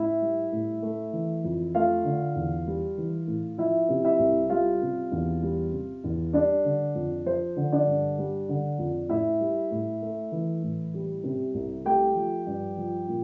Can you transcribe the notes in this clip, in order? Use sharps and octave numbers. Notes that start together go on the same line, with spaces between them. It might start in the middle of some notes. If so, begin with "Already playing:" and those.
Already playing: A2 E4 E5
G3
A2
A3
E3
F2
A3 F4 F5
D3
E2
G3
E3
A2
F3 E4 E5
C3
E4 E5
C2
G3 F4 F5
C3
E2
G3
C3
E2
G3 D4 D5
D3
F2
F3 C5
D3
D4 D5
G2
G3
D3
F2
A2 E4 E5
G3
A2
A3
E3
A2
G3
C3
C2
A3 G4 G5
F3
G2
F3
A#2